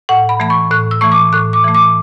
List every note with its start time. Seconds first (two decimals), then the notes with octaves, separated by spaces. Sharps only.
0.09 A2 F#5
0.29 B5
0.40 E3 A3 B5
0.50 C#6
0.71 A2 F#6
0.91 E6
1.01 E3 A3 C#6
1.12 D6
1.33 A2 F#6
1.53 D6
1.64 E3 A3
1.75 D6